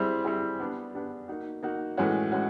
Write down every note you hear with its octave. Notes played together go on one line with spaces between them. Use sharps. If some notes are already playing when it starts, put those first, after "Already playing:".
Already playing: G3 C4 E4 G#4
G3 C4 E4 G#4
B3 D4 G4
B3 D4 G4
A#3 D#4 F#4
A#3 D#4 F#4
A2 E3 G#3 C#4 F#4
G#3 C#4 F#4